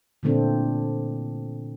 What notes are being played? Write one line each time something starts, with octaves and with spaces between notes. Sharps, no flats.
A#2 D3 E3 A3 C4 D4